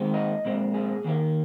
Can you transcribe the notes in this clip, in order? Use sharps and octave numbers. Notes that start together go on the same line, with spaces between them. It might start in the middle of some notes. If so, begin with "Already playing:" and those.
Already playing: D#2 D#3 G#3 C4
D#5
A#2 G#3 C4
G#4
D#2 D#3 A#3